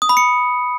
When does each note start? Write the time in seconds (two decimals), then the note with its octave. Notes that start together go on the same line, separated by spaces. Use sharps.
0.02 D#6
0.09 B5
0.17 C#7